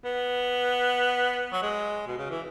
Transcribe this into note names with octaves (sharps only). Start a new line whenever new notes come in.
B3
F#3
G#3
B2
C#3
E3